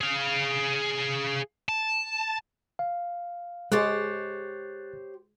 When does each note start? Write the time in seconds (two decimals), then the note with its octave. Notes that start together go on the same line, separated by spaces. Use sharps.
0.01 G#4 F5
1.69 A5
2.79 F5
3.72 G#3 G4 C5 C#5 F#6 A6